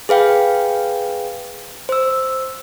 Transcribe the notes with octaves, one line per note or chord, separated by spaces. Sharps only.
G#4 B4 F5 G5
C5 E6